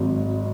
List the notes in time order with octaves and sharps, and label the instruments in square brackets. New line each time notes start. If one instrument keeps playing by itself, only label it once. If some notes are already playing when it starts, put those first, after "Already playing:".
Already playing: [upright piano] G#1 G#2 F#3